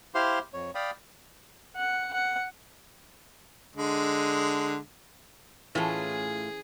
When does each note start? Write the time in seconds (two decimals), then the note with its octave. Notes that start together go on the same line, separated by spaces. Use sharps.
0.15 E4 G4 C5 F5 C6
0.53 F2 C#5
0.75 D5 F5 G5 B5 D#6
1.77 F#5
2.13 F#5
3.76 D3 G#3
5.75 A2 E3 A3 C#4 F4 G#4